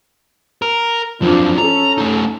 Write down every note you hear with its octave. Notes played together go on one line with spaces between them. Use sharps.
A#4
F2 F3 F#3 D4
C#4 A4 A#5
A3 D#4